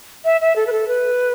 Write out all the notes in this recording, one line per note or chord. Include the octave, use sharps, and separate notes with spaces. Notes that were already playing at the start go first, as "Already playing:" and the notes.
E5
E5
A4
B4
A4
B4